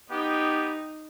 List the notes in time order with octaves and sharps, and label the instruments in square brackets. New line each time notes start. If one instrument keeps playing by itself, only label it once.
[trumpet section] B3 G4 [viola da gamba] D#4